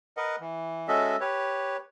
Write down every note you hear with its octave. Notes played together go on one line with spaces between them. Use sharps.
A#4 B4 D#5 F#5
E3
G#3 C#4 F#4 A4 D#5 E5
G4 B4 C#5